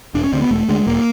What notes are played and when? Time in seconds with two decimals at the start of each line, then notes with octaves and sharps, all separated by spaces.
0.14 E1 D4
0.24 C#4
0.33 D2 D3 C4
0.42 B3
0.51 E1 A3
0.69 D2 D3 G#3
0.87 E1 A#3